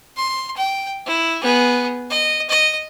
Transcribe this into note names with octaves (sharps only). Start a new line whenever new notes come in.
C6
G5
E4
B3 G#4
D#5
D#5